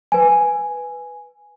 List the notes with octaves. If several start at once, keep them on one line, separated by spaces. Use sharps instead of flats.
B4 G#5